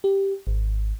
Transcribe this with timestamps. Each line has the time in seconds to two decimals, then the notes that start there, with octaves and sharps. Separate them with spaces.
0.04 G4
0.47 G#1